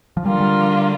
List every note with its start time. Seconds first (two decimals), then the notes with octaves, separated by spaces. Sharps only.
0.17 F3
0.25 D3 G3 A#3 F4
0.40 G3